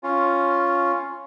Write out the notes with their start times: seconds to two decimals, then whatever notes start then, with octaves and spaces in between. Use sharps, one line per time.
0.03 C#4 F4